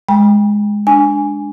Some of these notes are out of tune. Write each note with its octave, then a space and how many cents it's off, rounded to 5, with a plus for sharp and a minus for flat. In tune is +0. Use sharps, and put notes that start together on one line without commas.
G#3 +0 G5 +25 B5 -35
D4 +0 G#5 +0 C#6 +40